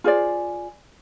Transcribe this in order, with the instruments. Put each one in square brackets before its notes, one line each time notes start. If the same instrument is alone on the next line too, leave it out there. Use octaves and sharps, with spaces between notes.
[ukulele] F4 G#4 C5 D5